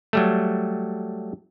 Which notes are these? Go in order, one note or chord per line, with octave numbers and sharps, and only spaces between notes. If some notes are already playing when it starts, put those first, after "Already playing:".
F#3 G3 A3